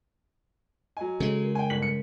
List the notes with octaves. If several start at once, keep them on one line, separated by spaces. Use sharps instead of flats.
F#3 D#5 G#5
C#3 G#3 A4
A#4
G5 G#5
G1 B6 F#7
C#7